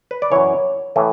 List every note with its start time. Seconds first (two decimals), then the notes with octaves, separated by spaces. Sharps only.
0.11 B4
0.22 D5
0.32 F#2 E3 C#5
0.96 A2 E3